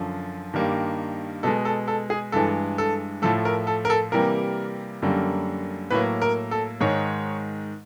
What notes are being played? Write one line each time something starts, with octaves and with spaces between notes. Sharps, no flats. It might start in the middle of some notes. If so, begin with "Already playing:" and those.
Already playing: F#2 D3 F3
G2 D#3 G3 A#3
B2 G#3 A4
A4
A4
G#4
G2 E3 G#3 A4
A4
A2 F3 A3 A4
A#4
A4
A#4
A4
C3 E3 G3 A#3 A#4
F#2 D3 G3 A#3
A2 F#3 A#3 B4
A#4
A4
G#2 D#3 G#3 C#5